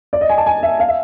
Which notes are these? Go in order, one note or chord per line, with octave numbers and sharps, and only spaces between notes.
D5
D#5
G#5
A5
G#5
E5
F5
E5